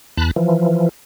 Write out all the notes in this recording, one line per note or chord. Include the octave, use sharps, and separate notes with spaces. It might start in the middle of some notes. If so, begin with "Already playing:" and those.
E2 A5 B5 F#6
E3 F3